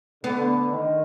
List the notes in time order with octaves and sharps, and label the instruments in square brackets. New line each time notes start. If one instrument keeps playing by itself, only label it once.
[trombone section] D3 [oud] B3
[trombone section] D#3